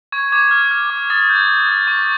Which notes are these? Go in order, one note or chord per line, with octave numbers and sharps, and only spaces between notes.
C#6 G#6
D6 G#6
F6
F6
D6
D#6 A6
G6
G6
D#6
C#6